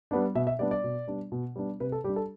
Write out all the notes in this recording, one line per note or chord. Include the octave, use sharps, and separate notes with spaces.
G3 B3 D4
B2 E5
E5
G3 B3 D4 D5
D5
B2
G3 B3 D4
B2
G3 B3 D4
C3 B4
A4
G3 D4 G4
A4